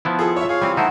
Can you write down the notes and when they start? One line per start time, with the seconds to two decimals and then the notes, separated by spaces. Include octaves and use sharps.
0.05 F3 B3 E4
0.19 F4 G#4 A4
0.36 C#5 E5 E6
0.49 G#4 C#5 F5
0.62 E3 G3 C4
0.77 A3 D#4 E4 C5 F#5